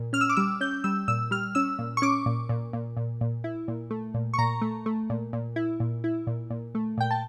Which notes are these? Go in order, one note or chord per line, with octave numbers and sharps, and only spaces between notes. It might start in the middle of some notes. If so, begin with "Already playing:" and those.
Already playing: A#2
C#4 F6
E6
D6
G3 E6
C#4 G6
G3 E6
A#2 E6
G3 F6
C#4 E6
A#2
C#6
C#4 D6
A#2
A#2
A#2
A#2
A#2
E4
A#2
A3
A#2
C#6
A#2 A#5
A3
A3
A#2
A#2
E4
A#2
E4
A#2
A#2
A3
A#2 G5
A5